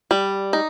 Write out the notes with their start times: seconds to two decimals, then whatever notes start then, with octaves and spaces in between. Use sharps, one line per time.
0.11 G3
0.53 D#4